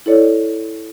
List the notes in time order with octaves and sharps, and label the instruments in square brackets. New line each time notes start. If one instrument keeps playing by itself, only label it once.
[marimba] E4 A4 C#5 D5